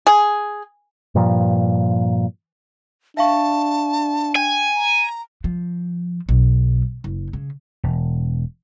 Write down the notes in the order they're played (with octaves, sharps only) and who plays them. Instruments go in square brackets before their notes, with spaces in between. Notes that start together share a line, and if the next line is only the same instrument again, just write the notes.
[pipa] G#4
[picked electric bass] G2 A#2 F3
[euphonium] D4 [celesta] E5 F5 C#6 [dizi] A5
[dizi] G5 [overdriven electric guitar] G#5
[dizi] A#5
[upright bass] F3
B1
F#1
C#3
[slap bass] E1